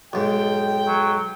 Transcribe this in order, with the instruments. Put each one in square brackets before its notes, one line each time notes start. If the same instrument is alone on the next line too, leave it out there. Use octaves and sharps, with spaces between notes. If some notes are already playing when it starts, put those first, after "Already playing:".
[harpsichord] B1 G#2 [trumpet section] G5
[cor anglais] F#3